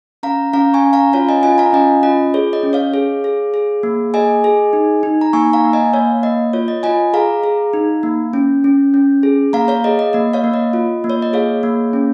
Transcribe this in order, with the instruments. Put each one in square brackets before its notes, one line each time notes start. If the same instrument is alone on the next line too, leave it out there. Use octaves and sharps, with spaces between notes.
[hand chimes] C#4 F5 A#5
C#4 F5 A#5
G#5 C#6
C#4
F5 A#5
F4 C#5 F5
D#5 G#5
F4 D#5 G#5
F5 A#5
C#4 D#5 G#5
F4 D#5
G#4 C#5
D#5
C#4
C#5 F5
G#4
G#4
G#4
A#3
G#4 D#5 G#5
G#4
D#4
D#4
A#5
A#3 G#5 C#6
F5 A#5
A#3
D#5 G#5
A#3 C#5 F5
A#3 D#5
F4 C#5
D#5
F4 D#5 G#5
G#4 F5 A#5
G#4
D#4
A#3
C#4
C#4
C#4
G#4
A#3 F5 A#5
C#5 F5
G#4 D#5
D#5
A#3 D#5
C#5 F5
A#3
D#5
F4
A#3
C#5
D#5
G#4 C#5 F5
A#3
C#4